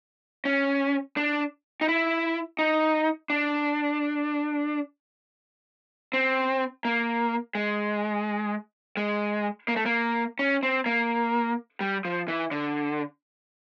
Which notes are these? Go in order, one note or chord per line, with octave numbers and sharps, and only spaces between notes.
C#4
D4
D#4
E4
D#4
D4
C4
A#3
G#3
G#3
A#3
A3
A#3
C#4
C4
A#3
G3
F3
E3
D3